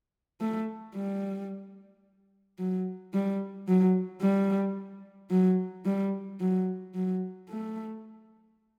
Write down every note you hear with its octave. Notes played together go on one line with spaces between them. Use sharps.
A3
G3
F#3
G3
F#3
G3
F#3
G3
F#3
F#3
A3